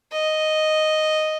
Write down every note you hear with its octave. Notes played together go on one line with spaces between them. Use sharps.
D#5